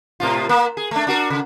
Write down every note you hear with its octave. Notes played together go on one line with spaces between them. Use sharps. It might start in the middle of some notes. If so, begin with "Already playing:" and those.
A2 C3 F4
A#3
G#4
A3 D4
D4 F#4 A#4
C#3